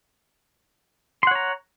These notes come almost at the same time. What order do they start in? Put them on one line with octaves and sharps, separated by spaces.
C6 F#5 C#5 A#5